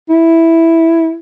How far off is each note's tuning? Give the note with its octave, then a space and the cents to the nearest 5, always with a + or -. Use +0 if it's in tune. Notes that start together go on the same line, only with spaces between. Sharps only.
E4 +0